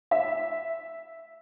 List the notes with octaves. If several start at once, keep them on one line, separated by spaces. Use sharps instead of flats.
E5